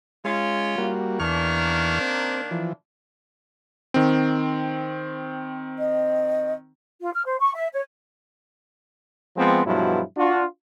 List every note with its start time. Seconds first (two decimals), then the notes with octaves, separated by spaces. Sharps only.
0.24 G#3 C#4 F4
0.78 G3 A#3 F#4
1.20 E2 D#3 A#3 D4 C#6 F6
2.01 C4
2.51 E3 F3
3.94 D#3 C4
5.79 D#5
7.01 F4
7.14 F6
7.25 C5
7.40 C#6
7.55 E5
7.73 C#5
9.37 F3 G#3 B3 C4
9.66 G2 B2 F3 F#3 G#3 E4
10.18 D4 F4 F#4